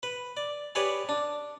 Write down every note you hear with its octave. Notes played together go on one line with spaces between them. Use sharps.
B4
D5
G4 G#4 B4 C#5 D5 G5
D4